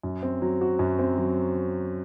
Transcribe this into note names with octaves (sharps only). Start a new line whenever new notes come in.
F#2
C4
F#3
F#4
F#2
C4
F#3